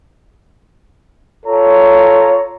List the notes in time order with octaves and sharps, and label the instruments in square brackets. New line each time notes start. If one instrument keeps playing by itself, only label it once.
[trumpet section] F4 A4 C#5 A#5